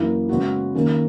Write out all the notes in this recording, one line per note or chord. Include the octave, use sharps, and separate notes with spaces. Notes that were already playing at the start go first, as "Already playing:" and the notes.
Already playing: F#2 E3 A#3 E4
C#3 G#3 B3 F#4
D#3 A#3 C#4